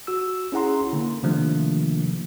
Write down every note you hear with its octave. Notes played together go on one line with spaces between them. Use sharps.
F#4 E6
C#4 E4 G#4 F#5 A#5 C6
D3 A#3
C3 D#3 F3 A3 A#3 D4